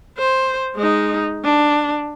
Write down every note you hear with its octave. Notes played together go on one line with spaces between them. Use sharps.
C5
G#3 D#4
D4